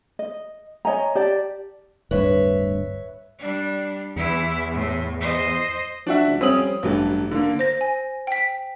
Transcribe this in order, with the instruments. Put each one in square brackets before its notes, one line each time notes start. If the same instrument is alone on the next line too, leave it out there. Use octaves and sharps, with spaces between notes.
[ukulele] D#5
C#5 D#5 G#5 A#5
G4 D5 A5
[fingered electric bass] D1 G2 [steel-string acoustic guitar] B4 C#5 E5
[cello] G3 D4
[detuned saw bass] E2 [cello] E3 E4
[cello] A2
C5 D#5
[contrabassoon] F3 [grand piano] D4 F#4 E5
[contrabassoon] C#2
[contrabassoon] F2 [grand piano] G3 D#6 F#7 [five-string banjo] C4 C#4
[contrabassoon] A1 [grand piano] G2 F#3 [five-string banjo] E3 A4
[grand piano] D3 A#3
[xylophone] C5 A#6
G#5
G5 B6